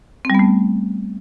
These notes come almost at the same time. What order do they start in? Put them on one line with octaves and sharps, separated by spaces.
C4 G3 B3 A3